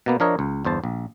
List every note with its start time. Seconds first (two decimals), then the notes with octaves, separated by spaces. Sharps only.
0.06 B2 A#3 B3
0.20 F3 D4 A#4 C#5 D#5
0.39 C#2
0.65 G1 E2 C5 A5
0.84 A#1